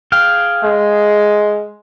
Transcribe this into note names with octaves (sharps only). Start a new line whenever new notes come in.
G#4 F5 G5
G#3